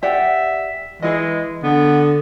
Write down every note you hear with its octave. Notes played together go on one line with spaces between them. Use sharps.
G4 D5 E5 F#5
E3 G#3 G#4 D#5
D3 B3